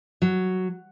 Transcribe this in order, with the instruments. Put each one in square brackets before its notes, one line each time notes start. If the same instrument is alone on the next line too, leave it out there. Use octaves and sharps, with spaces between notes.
[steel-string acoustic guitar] F#3